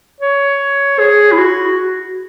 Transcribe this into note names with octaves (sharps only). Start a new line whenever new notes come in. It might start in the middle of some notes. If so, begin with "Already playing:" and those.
C#5
G#4
E4
F#4